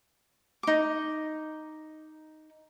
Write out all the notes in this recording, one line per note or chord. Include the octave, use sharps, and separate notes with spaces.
D#4 D6